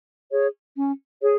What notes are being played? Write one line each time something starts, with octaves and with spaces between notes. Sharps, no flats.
G#4 C#5
C#4
G#4 C#5